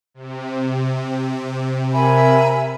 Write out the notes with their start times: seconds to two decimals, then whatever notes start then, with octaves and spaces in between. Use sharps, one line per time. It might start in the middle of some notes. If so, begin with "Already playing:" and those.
0.14 C3
1.93 A#4 E5 G#5 B5